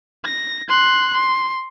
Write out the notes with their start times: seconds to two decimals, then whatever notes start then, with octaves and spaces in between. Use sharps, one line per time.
0.25 A#6
0.69 C6 F#6
1.14 C6